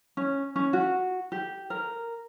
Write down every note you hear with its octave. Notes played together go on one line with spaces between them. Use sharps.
C#4
C#4
F#4
G4
A#4